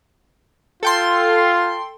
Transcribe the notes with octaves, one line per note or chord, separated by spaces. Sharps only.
F4 A4 G5 C6